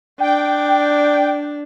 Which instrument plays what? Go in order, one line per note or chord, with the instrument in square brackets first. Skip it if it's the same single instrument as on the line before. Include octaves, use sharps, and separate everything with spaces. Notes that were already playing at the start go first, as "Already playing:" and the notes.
[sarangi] D4 [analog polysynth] G5